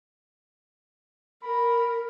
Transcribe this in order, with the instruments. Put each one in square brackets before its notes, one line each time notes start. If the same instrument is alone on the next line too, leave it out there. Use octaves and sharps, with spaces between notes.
[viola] A#4 [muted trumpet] B5